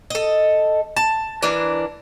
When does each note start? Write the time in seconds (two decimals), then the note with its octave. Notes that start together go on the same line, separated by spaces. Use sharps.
0.10 A4 D#5
0.96 A5
1.42 E3 D4 A#4